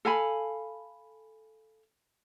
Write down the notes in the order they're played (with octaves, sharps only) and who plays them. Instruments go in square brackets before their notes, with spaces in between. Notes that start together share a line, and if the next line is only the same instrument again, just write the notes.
[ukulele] A4 F5 G#5 B5